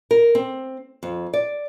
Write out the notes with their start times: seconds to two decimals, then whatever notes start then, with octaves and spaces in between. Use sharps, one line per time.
0.11 A#4
0.35 C4
1.03 F2
1.34 D5